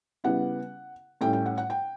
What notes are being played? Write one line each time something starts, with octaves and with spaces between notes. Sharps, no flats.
C#3 G3 B3 E4 F#5
A2 G3 C#4 E4 G5
G5
F#5
F#5
G5